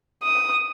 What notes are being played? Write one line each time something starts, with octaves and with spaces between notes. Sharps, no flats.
D#6